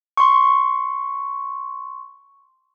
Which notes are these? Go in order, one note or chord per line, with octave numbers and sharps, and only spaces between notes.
C6 C#6